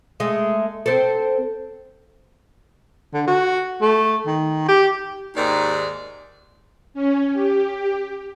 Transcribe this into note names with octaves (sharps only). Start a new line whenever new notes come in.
G#3 A3
C4 A4
D3
F#4
A3
D#3
G4
D#2 G#2 D#3 D5
C#4
G4